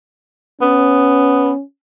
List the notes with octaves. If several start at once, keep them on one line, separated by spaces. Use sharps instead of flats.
B3 C#4